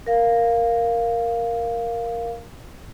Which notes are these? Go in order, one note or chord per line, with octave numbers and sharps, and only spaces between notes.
A#4 F5